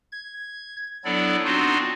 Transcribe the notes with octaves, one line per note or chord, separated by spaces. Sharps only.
G#6
F#3 B3 D4 E4 A4 D5
B3 C4 D4 D#4 F4 F#4